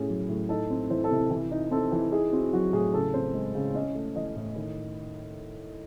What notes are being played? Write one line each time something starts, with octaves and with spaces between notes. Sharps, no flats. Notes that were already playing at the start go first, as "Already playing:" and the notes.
Already playing: A2 C#4 G#4
F#3
A2
D#4 A4
C4
E3 C5
A4
C3
E3
D#4
C4 A4
E3
D#4 G#4
C4 F#4
F#3 F#4
A2 G#4
C#3 A4
C4 C5
G#3
C#3
C#4 D#5
A3
E3 D#5
A2
D#3